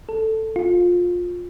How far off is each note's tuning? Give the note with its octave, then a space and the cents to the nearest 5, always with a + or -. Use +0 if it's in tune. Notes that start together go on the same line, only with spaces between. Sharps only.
A4 +5
F4 +20